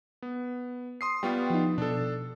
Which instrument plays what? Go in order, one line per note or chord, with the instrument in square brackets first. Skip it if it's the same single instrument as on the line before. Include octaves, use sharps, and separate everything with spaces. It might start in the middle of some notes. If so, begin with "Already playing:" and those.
[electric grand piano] B3
C6 D#6 C7
[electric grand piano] G3 B3 F4 [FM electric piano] G5 C#6 D#6
[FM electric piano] F3 D#4
[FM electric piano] B2 [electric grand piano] D4 A4